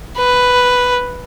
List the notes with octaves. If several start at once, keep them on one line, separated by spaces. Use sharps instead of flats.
B4